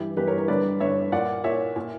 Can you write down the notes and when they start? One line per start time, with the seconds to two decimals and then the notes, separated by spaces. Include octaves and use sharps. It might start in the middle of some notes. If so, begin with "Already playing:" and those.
Already playing: G2 E3 E4 G4
0.17 G2 E3 G4 B4
0.27 A#4 C#5
0.38 A#4 C#5
0.48 G2 D3 B4 D5
0.80 G2 D3 C#5 E5
1.12 A#2 D5 F#5
1.44 A#2 C#5 E5
1.76 A#2